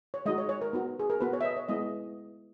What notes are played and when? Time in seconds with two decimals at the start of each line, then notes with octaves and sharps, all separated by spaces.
0.14 C#5
0.26 G#3 D#4 F#4 D#5
0.38 C#5
0.49 C#5
0.62 A#4
0.73 B3 D#4 F#4
0.99 G#4
1.10 A#4
1.21 B3 F#4 B4
1.33 C#5
1.41 E5
1.45 D#5
1.56 C#5
1.68 G#3 B3 E4 D#5